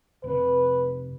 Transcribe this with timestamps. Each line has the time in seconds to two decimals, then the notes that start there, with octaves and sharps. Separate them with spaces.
0.24 F1 C3 B4